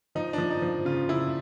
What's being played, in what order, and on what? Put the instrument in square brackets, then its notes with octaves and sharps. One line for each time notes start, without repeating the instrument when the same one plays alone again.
[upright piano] F3 [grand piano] D#4
[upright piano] F3 [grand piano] D4
[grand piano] D#4
[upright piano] F3
[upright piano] C#3 [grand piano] F4
[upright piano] C#3 [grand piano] E4